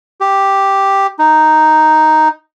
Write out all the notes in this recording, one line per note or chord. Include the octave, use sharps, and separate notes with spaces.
G4
D#4